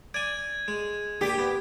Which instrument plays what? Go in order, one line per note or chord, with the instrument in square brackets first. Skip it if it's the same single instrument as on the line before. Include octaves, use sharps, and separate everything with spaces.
[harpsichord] D5 G#5 [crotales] G#6
[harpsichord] G#3
[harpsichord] A#2 D6 [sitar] G4
[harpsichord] B3